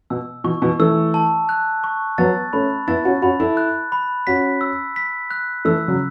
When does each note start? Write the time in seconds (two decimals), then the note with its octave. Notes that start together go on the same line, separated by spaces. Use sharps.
0.10 B2 E6
0.44 B2 E3 C#6
0.62 B2 E3
0.79 E3 A3 E6
1.14 A5
1.49 F#6
1.84 C#6
2.18 F#3 B3 A6
2.53 A3 C#4 B5
2.88 B3 E4 A6
3.05 C#4 F#4
3.22 C#4 F#4 B5
3.40 E4 A4
3.57 F#6
3.92 B5
4.27 C#4 F#4 B6
4.61 E6
4.96 B6
5.31 F#6
5.65 E3 A3 E6
5.88 C#3 F#3